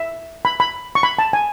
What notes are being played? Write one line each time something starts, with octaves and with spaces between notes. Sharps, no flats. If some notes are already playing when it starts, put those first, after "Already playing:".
Already playing: E5
B5
B5
C#6
B5
A5
G#5